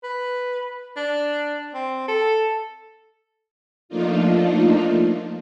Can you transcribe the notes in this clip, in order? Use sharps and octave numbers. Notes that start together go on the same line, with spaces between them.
B4
D4
C4
A4
F3 A3 A#3 D4 D#4 F4